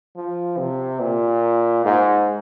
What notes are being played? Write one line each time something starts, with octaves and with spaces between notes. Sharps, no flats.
F3
C3
A#2
G#2